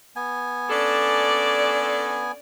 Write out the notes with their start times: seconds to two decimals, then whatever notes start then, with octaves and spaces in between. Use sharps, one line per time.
0.16 B3 G#5
0.70 C#4 D4 A4 D5